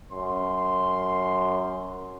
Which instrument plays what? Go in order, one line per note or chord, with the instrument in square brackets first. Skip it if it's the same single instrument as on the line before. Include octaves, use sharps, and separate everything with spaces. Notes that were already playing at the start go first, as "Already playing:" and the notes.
[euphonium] F#2 [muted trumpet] C6